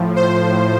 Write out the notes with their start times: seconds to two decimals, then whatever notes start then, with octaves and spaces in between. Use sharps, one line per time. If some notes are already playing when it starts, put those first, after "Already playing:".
Already playing: A2 F3
0.16 C5